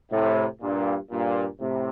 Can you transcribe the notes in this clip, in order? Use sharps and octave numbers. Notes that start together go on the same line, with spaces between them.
A2 C3
G2 A#2
G2 A#2
A2 C3